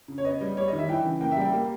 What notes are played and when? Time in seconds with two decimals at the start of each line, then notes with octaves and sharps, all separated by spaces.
0.08 C#3
0.18 C#5
0.24 B3 D#5
0.41 G3
0.57 G3 C#5
0.68 D#3 D#5
0.79 E5
0.89 E3 G5
1.05 C#3
1.21 A#3 G5
1.31 E5
1.37 G3
1.42 G5
1.52 A#3